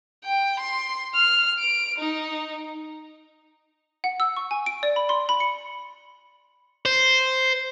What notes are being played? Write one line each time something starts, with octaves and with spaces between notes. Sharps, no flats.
G5
C6
F6
D7
D#4
F#5
E6
C#6
G#5
D7
D5
B5
C6
B5
C#7
C5